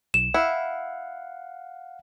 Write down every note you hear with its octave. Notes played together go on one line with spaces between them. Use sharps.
B1 E7
E4 F5 F#5